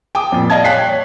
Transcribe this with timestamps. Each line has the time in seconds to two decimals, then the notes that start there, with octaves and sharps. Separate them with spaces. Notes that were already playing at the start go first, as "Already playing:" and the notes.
0.15 G5 D6 D#6
0.32 F2 A#2
0.50 D5 D#5 F5 A5 G#6
0.64 C#5 G5 F#6 B6 C7
0.86 C#5